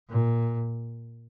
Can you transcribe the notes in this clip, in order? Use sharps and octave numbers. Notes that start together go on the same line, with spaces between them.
A#2